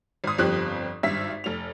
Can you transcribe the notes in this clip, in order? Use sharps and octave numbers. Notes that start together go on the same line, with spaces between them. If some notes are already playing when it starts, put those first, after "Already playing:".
G#1 D#6
G1 F2 F3 G4 F#6
G#1 G2 E5 B6
F1 F7